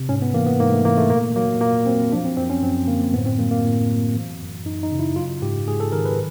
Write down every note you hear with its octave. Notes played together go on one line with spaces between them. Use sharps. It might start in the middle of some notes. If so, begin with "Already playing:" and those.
Already playing: C3
G#2 C#4
B3
E3 A#3
B3
G#2 A#3
A3
E3 A#3
A3
A#2 A#3
F#3 A#3
A#2 A#3
F#3 C4
F3 D4
C4
F#2 C4
C#4
F#2 C4
D3 A#3
A2 B3
C4
F#3 A#3
A#3
A2
F#3
E3
F#2
F#2 D#4
D#4
C#3
E4
F#3 F4
G#2 G4
G#2 G#4
A4
D#3 A#4
B4